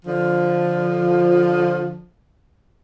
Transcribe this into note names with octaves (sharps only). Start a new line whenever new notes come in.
D3 F3